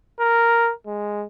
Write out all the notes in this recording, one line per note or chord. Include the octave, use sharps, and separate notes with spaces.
A#4
G#3